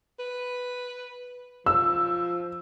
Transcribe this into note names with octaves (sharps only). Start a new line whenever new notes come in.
B4
F3 E6